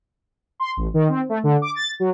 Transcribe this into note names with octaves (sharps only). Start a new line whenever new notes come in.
C6
A1
D#3
C4
A3
D3
D6
A6
F#3